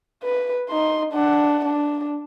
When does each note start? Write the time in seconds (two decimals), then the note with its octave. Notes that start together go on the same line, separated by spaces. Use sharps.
0.23 B4
0.69 D#4 C6
1.12 D4 F#5
1.65 D4